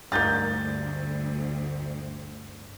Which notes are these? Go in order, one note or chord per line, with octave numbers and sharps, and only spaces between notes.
D2 G2 A#3 D#4 G#4 G6 A6